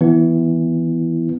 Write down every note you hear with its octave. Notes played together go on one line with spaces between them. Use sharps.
E3 B3 E4